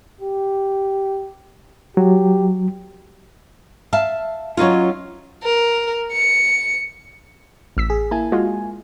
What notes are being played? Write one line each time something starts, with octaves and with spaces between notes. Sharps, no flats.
G4
F#3 G4
E5 F5 A5
F#3 C#4 D#4 F4
A#4
C#7
A1 E6 B6
G#4
A#3 E4 G#5 A5
G#3 F4 F#4